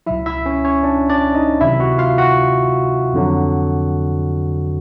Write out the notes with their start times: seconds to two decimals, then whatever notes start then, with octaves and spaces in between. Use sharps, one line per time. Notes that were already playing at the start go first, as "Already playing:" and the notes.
0.06 C#2 B2 F#3 E4 E5
0.26 E4 E5
0.46 C#4 C#5
0.65 C#4 C#5
0.83 D4 D5
1.10 D4 D5
1.35 D#4 D#5
1.61 D2 C3 D#3 F#3 E4 E5
1.80 F#4 F#5
1.98 F4 F5
2.18 F#4 F#5
3.14 F2 D3 F#3